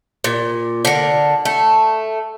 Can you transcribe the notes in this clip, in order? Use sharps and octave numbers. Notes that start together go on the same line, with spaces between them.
A#2
D3 A#4
A3